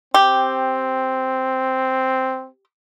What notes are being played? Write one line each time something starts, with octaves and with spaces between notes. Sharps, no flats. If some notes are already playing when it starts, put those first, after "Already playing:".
C4 G4